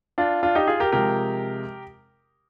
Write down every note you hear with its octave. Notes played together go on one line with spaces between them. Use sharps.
D4 F4
D4 F4
D#4 G4
F4 G#4
G4 A#4
C3 F3 G#3 G4 A#4